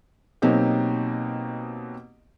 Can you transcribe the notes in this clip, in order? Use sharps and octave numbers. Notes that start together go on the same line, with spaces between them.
B2 F#3 A#3 C4 D#4 G4